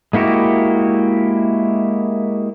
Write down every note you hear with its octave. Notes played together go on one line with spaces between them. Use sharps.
G#3 A#3 E4 F#4 G4